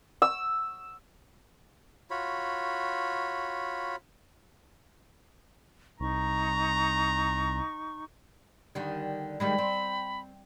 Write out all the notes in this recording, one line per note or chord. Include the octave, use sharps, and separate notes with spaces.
E6
F4 F#4 C#5 B5
C2 D#4 A#5 C#6
D3 D#3 G3
D#3 G3 G#3 B5
C4